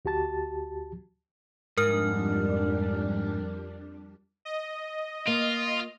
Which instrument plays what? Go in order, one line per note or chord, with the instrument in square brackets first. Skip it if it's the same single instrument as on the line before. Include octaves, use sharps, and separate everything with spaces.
[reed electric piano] D2 F#4 G4 A5 A6
[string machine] F2 G3 D4 [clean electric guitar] G#2 [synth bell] A#4 F6
[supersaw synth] D#5
[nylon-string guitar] A#3 [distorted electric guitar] F4